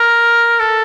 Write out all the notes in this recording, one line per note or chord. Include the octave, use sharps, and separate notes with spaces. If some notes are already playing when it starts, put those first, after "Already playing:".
Already playing: A#4
A4